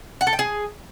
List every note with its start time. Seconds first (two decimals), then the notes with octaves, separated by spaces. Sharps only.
0.21 F#5
0.27 A4
0.33 G5
0.39 G#4